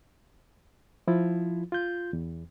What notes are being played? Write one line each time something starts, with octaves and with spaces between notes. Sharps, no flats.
F3 E4 F4
F4 G6
E2